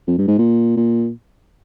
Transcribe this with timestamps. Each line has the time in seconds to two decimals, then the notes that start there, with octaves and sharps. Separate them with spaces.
0.07 F2
0.18 G2
0.27 G#2
0.38 A#2
0.77 A#2